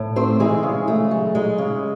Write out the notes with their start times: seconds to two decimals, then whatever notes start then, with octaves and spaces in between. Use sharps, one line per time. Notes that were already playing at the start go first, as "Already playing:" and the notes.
Already playing: A2
0.16 A3 C4 C5
0.40 E3 G#3 G#4
0.63 C#3
0.88 A3
1.11 F#3
1.35 G#3
1.58 C#3